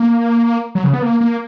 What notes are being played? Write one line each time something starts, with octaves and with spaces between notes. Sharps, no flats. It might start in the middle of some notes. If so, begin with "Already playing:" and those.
Already playing: A#3
F#3
C#3
B3
A#3
A#3